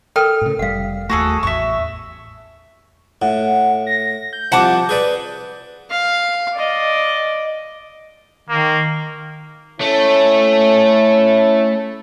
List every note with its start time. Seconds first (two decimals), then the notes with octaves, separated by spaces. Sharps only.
0.16 A4 A#4 G5 F6
0.41 A2 C#3
0.59 F1 A#2 G3 F5 F#5
1.09 D#2 A3 F#4 G#4 A4
1.43 A1 E2 E5 C#6
3.22 A2 F#5
3.86 A#6
4.33 G6
4.52 C2 F3 F#5 A5 D6
4.89 G#4 B4 D5
5.90 F5
6.55 D5 D#5
8.49 D#3 A#3
9.81 A3 C#4 E4 C#5